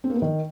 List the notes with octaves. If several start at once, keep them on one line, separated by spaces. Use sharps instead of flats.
C4
A#3
B3
D#3